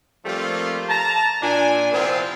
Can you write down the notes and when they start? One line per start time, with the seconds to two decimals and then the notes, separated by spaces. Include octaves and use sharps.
0.25 F3 G3 A3 A#3 C4 F4
0.89 A5 A#5
1.42 A#2 D4 G#5
1.92 C3 F3 B3 C4 E4 F4